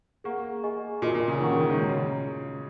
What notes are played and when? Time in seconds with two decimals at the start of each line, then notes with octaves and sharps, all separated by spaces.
0.24 A#3 G#4 F#5 C#6
0.64 G#4 D#5 G#5 C#6
1.02 A#2 F#4 D#5 G#5
1.15 A#2
1.28 C#3
1.40 D#3 F#4 A#4 F#5 A#5 C#6
1.50 C#3
1.60 D#3
1.70 G#2
1.79 A#2 F#4 C#5 A#5
1.89 C#3